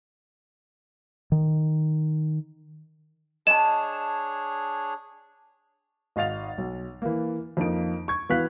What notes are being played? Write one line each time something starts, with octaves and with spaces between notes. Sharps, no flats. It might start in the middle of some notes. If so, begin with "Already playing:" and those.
D#3
D4 G#4 C#5 D#5 A5 E7
G#1 D#5 F5 A6 F7
B1
E3 A#3
F2 F3 A#3 D#4 D7
C#6 G#6
E3 B3 F#4 F5 F#6 B6